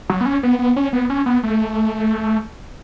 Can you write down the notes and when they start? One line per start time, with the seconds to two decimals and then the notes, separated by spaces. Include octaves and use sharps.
0.10 F#3
0.21 B3
0.26 C#4
0.43 B3
0.59 B3
0.76 C#4
0.93 B3
1.10 C#4
1.26 B3
1.43 A3